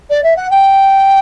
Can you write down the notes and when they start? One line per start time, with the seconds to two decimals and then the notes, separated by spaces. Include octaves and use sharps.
0.10 D5
0.23 E5
0.36 F#5
0.50 G5